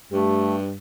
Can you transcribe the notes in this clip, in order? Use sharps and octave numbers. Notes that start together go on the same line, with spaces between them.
G2 A3 G4